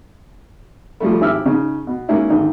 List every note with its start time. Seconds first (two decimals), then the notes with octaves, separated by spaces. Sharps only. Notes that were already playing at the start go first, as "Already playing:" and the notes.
1.00 F3 G3 A3
1.21 G#1 E4 G4 E6 F6
1.46 C#3 D#4
1.87 B2
2.09 G#3 A#3 C#4 D#4 E4
2.30 G#1 D3 D#3 D#4